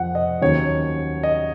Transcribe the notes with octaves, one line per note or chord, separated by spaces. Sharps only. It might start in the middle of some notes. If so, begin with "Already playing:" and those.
Already playing: F2 F3 F#5
D#5
D#2 D#3 F#3 C#4 C#5
D#5